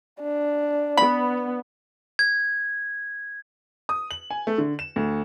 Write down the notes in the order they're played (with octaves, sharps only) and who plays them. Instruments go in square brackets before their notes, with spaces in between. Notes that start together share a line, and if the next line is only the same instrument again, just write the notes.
[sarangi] D4
[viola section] B3 [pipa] B5
[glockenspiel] G#6
[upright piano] D#6
F#7
G#5
A3
D3
E7
D2